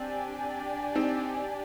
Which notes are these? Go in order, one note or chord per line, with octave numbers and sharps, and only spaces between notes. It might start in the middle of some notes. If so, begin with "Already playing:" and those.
Already playing: C4 D4 G4 D5 G#5
C4 D#4